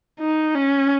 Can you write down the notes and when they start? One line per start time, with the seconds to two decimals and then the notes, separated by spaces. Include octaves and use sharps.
0.20 D#4
0.55 C#4